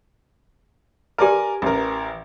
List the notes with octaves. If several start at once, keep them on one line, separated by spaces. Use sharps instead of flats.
G4 A#4 B4 D5 G#5
A1 A#4